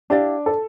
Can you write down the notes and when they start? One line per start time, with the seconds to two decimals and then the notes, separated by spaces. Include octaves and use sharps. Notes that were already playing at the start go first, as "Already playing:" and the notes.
0.10 D4 E4 G4 D5 F5
0.46 A4